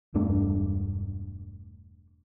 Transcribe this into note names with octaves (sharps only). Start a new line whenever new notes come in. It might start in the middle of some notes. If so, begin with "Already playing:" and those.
E1 G2 A3 D4